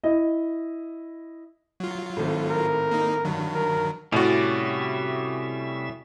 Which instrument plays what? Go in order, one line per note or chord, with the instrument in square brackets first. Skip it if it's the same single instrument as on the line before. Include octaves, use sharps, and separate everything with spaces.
[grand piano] E4 D#5
[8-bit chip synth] F#3 F4
[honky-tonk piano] G#1 A2
[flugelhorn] A#4
[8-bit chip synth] A#3 D#4
[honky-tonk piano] G2 [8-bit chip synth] D#3 F#3
[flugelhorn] A#4
[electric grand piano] A2 F#4 [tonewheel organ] C3 E5 [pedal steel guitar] G3 C#4 D5